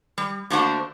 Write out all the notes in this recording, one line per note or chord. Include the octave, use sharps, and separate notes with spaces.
G3
D3 A3 A#3 D4 F#4 C5